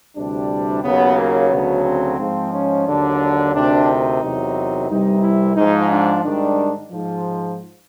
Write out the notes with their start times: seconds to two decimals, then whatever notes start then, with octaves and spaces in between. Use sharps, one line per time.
0.16 D2 C3 E3 G3 D4
0.83 D#2 C#3 F#3 B3
1.17 A#3
1.50 D2 C#3 F#3 B3
1.84 C4
2.18 G#2 F3
2.52 C#4
2.86 D#2 D3 F#3 D4
3.54 D2 C3 D#3 D4
3.88 D#4
4.22 E2 C3 D#3 F#3
4.88 C2 C3 E3 G3 D#4
5.22 E4
5.56 G#2 F3 D#4
5.90 D4
6.23 G#2 D#3 G3 D4
6.91 G#2 F3